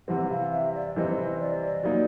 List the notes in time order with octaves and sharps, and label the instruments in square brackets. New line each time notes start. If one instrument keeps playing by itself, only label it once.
[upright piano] C3 E3 G3 C4 [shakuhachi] F#5
[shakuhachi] F5
E5
D5
[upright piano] C3 E3 G3 C4 [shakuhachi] D#5
[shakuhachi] D5
[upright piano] F#3 A#3 D#4